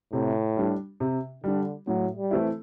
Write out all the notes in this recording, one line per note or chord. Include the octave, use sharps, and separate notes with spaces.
A2 C3
G3 D4
C3
D3 G3 D4
A2 F#3
G3
E3 A3 C4 E4